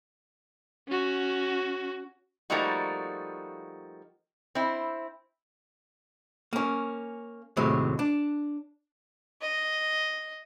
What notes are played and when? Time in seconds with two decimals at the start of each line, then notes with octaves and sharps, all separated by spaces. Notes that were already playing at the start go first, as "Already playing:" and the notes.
0.88 C#4 F#4
2.50 F3 G3 A3 A#3 D#4 F#4
4.55 C4 E4
6.53 A#3 C#4
7.57 D#2 A2 C3 F#3 G#3
7.99 D4
9.41 D#5